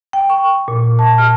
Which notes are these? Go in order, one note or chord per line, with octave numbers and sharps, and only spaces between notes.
G5
C#6
A#2
A5
F6